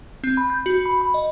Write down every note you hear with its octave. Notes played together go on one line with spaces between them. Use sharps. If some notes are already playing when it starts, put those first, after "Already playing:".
C4
B5
G6
F#4
B5
B5
D#5